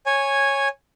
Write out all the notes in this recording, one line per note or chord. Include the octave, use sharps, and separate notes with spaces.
C#5 G#5